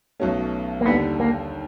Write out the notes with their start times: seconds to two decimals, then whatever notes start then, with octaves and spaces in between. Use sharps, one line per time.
0.20 B1 B2 F#3 A3 C#4
0.81 A#3
0.86 D#2 D3 G3 B3
1.20 A#3